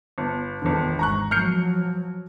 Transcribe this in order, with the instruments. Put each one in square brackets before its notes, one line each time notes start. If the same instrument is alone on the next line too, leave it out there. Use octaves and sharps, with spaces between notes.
[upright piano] G1
[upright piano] G1 D3 [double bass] E2 D#3
[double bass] G#1 [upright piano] A#5 C#6 F#6
[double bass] F3 F#3 [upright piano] F6 G6 C#7